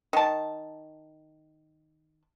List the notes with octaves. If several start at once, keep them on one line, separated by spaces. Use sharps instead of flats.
D#3 A5